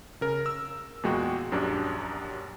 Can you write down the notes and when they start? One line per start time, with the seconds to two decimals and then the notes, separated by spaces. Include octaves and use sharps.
0.21 C#3 A#4
0.46 E6
1.03 E2 A#2 G#3 F#4 G5
1.51 A#1 F#2 F#3 D4 G4